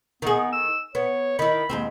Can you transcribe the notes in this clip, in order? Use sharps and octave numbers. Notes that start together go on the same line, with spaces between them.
D#3 B3 G#4
E6
B3 C#5
D#3 E4 B5
D#2 G#2 C4